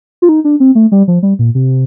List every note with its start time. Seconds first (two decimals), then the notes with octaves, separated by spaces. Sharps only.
0.22 F4
0.29 D#4
0.45 D4
0.60 C4
0.75 A3
0.92 G3
1.08 F3
1.23 G3
1.39 A#2
1.55 C3